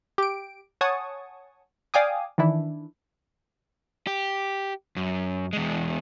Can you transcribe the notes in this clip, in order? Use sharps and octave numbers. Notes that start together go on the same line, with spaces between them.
G4 D7
C#5 F#5 G#5 A5 C#6 D#6
D5 F5 G5 G#5 D6 D#6
D#3 E3 D4 E4
G4
F#2
E2 G#3